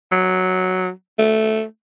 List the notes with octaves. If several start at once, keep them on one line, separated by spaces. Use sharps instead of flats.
F#3
A3